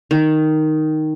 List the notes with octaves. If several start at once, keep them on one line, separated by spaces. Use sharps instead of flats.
D#3